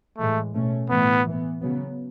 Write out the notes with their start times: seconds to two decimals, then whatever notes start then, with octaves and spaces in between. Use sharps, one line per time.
0.18 A2 E3 G#3 A3
0.54 B2 A3 C#4
0.90 A2 E3 A3 B3
1.26 E3 B3
1.62 C#3 F#3 B3